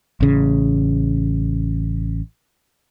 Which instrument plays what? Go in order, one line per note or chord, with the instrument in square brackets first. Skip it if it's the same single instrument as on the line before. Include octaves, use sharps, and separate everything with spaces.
[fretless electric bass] A1 C#3